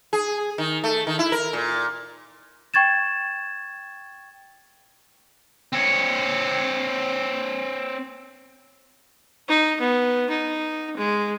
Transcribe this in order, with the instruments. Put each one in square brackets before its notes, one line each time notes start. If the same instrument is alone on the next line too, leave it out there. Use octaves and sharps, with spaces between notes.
[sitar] G#4
D#3
A3
D#3
E4
A#4
A#2
[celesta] G5 C#6 G#6 A6 E7
[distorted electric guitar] C4 C#5
[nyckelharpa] D#4
B3
D#4
G#3